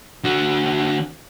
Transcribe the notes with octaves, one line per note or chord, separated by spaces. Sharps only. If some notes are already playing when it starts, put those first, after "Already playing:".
D3 F#4